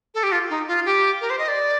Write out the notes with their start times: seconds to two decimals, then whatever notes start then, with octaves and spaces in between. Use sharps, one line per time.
0.15 A4
0.23 G4
0.32 F4
0.50 D#4
0.68 F4
0.86 G4
1.21 A#4
1.30 C5
1.39 D#5
1.48 D5